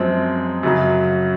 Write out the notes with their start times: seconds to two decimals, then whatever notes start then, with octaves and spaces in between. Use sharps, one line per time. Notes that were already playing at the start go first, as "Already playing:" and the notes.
Already playing: F#2 F3 G#3 C4
0.63 F#2 C#3 F#3